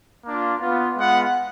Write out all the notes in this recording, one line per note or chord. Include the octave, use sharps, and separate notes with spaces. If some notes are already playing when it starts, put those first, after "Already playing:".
A#3 D4 F4
B3 F4
G#3 B3 F4 F#5